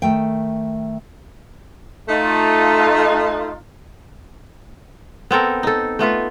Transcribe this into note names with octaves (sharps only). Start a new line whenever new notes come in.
D#3 A3 G5
A3 D#4 F4
B3 C4 A4 A#4
D#4 A4
A3 B3 F4 B4